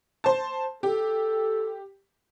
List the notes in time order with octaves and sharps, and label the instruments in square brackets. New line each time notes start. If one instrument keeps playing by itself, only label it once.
[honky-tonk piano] C5 A5
[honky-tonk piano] G4 [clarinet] A4